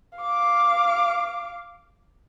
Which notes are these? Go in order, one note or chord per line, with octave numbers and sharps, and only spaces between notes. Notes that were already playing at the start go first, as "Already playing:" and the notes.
F5 D6